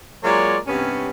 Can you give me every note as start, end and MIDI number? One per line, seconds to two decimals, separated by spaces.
0.24 0.57 54
0.24 0.57 56
0.24 0.57 58
0.24 0.57 65
0.24 0.57 73
0.24 0.57 74
0.66 1.10 43
0.66 1.10 48
0.66 1.10 59
0.66 1.10 61